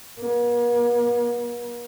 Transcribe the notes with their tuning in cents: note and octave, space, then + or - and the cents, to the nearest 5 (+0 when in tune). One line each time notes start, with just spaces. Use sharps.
A#3 +45